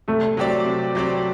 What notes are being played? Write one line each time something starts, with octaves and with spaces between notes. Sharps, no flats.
C3 A3
F#3 C4 G4 D5
C3
F#3 C4 G4 D5